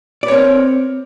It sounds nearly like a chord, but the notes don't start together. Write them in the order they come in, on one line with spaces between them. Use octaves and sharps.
D5 B4 C#5 C4 A#4